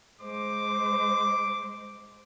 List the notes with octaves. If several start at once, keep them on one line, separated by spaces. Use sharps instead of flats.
G#3 C5 D6